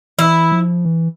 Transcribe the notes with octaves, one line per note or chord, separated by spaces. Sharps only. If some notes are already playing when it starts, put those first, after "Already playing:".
E3 E4
F3
E3